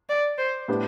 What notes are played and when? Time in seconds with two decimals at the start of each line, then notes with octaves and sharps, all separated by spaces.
0.09 D5
0.38 C5
0.68 A2 G3 B3 D4 G4